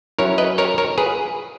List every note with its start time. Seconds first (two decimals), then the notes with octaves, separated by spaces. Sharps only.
0.18 F#3 C#4 E4 A#4 C#5
0.38 B4 D#5
0.58 A#4 C#5
0.78 A#4 C#5
0.98 G#4 B4